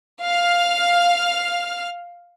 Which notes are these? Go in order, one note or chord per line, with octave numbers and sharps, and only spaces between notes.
F5 F6